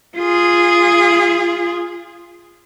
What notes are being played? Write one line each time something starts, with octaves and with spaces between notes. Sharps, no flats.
F4 G#4